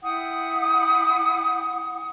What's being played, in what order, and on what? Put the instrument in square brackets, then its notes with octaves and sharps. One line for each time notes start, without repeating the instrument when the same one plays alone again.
[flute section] E4 F#5 G5 D#6